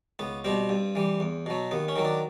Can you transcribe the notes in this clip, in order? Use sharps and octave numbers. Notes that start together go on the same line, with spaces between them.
C#2 B3
B2 G3 C4
G2
E3 G3
E2
B2 F#3
D#2 B3
C#4
D#3 F#3
D4